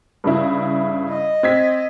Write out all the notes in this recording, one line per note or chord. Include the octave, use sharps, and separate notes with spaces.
G2 C#3 E4
D#5
C4 G#6 B6